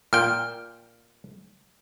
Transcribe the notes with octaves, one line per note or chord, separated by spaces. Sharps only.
A#2 G5 F6